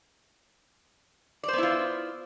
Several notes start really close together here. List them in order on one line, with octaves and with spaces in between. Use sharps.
D5 C5 B3 E4 F4